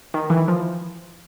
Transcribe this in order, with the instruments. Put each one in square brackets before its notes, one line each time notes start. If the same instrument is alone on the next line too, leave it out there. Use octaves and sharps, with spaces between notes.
[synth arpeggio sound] D#3
E3
F3